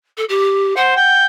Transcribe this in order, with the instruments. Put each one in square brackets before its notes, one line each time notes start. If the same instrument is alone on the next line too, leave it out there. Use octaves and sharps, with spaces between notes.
[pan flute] A4
G4
[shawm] C5 [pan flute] F#5
[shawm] G5